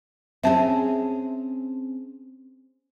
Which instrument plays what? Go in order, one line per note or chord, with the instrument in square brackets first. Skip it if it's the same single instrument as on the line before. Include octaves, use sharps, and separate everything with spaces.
[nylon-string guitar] C4 C#4 G#4 [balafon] E5 A5